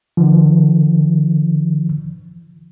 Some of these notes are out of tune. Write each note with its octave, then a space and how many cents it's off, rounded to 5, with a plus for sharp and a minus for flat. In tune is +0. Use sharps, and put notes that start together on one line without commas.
D3 +30 F3 -35